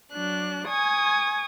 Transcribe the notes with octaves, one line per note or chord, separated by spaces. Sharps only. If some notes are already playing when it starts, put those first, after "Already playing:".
F#3 D4 F#6
G#5 C#6 D#6 G#6